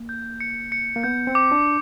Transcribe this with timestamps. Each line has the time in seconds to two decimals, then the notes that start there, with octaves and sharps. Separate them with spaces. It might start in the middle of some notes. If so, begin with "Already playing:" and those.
Already playing: A#3
0.09 G6
0.40 C#7
0.72 C#7
0.96 A#3
1.04 B3 G6
1.27 C4
1.35 D6
1.51 D4